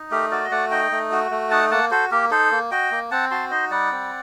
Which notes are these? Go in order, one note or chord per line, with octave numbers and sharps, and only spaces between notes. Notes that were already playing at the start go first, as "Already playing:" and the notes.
Already playing: D#4
A3 G4 A#4
F#4 A#4 D5
D#5
A3 D5 F#5
D#4 D#5 G5
A3
F#4
A3
D#4 F#5 A5
A#3 F#5 A5
F#4 A4 C5
A#3 G4 A#4
D#4 A4 C5
A#3
F#4 D#5 G5
A#3
C4 F#5 A5
F#4 A5 C6
D#4 C5 D#5
G3 D5 F#5
C4